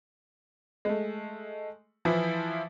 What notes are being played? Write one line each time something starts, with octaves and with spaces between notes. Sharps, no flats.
G#3 A3
E3 F3 E4